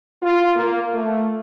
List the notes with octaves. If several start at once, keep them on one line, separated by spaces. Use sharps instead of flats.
F4
A#3
A3